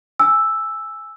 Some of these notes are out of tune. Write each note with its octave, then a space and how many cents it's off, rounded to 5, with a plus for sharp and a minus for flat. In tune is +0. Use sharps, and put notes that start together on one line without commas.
G#5 +0 E6 +0